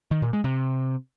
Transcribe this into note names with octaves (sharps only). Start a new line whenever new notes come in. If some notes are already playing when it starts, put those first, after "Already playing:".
D#3
A#2
G#3
C3